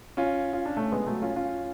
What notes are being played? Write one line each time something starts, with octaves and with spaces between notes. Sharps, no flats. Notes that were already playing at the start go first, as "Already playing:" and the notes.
C#4 F4
F4
D4
A3 C#4
G#3 B3
F#3 A3
C#4 F4
C#4 F4